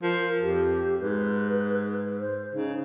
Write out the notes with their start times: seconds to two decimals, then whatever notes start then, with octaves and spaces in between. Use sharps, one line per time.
0.03 F3 A#4
0.42 F2 G4
1.01 G#2 B4
2.19 C5
2.54 C#3 D#4